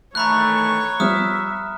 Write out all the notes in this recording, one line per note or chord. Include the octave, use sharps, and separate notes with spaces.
D#3 E3 A3 C#5 A#5 B5 C#6 F#6
F3 G3 B3 E5 D#6 F6